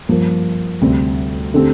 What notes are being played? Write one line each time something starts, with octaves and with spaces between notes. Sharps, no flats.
G2 F3 A#3
D2 C3 G3 C4
D3 A3 C4 G4